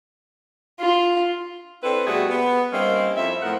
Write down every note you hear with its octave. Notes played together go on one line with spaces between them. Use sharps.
F4
C4 D4 E4 A4 B4
B2 G3 A3 F#4 G#4
B3
G3 A#3 C4 C#4 D#4
F2 E4 E5
A2 F3 B3 A#4 F#5